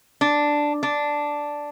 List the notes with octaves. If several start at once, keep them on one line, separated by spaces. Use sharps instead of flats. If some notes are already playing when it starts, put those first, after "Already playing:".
D4
D4